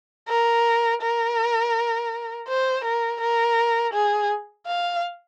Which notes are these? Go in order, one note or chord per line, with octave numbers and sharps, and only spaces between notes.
A#4
A#4
C5
A#4
A#4
G#4
F5